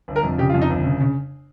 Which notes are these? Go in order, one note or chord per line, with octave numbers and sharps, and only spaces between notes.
G1
A#4
F2
C#3 G4
F4
F2
D#4
G1
C#3
C#3